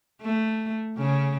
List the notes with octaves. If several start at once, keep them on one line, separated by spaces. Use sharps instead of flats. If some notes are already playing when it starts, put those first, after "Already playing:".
A3
C#3